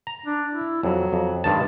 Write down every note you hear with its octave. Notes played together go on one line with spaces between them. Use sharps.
A#5
D4
E4
F2 F#3
F2
G2 D#3 G#3 A5